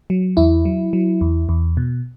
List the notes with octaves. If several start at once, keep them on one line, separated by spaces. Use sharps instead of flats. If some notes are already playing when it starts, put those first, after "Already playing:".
F#3
E2 E4
F#3
F#3
E2
E2
B2